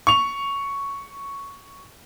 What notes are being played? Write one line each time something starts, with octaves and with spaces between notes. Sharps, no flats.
C#6 F7